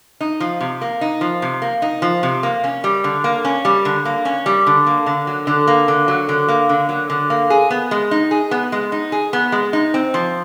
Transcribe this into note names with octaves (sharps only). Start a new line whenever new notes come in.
D#4
F3
C3
A#3
D#4
F3
C3
A#3
D#4
F3
C3
A#3
C#4
G3
D3
A#3
C#4
G3
D3
A#3
C#4
G3
D3
A#3
D3
F#3
D3
A#3
D3
F#3
D3
A#3
D3
F#3
D3
A#3
G#4
B3
G#3
D#4
G#4
B3
G#3
D#4
G#4
B3
G#3
D#4
C4
F3